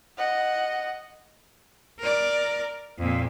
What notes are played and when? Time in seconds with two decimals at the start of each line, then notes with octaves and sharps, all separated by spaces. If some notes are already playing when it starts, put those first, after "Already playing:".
0.18 D#5 F#5
2.00 A#4 D5
2.99 F2 A#2